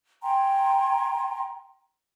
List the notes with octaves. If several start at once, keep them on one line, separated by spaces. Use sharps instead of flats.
G5 G#5 A#5 C6